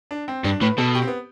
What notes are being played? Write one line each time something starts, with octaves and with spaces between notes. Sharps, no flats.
D4
C4
G2 D4
A2 B4
B2 A4
G4
C4
B3